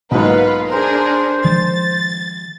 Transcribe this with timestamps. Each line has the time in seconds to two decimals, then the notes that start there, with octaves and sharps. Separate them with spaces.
0.11 B1 G#2 A#3 F4 B4 F#5
0.69 D4 G#4 A#4 C5
1.44 D#3 F3 G#3 A6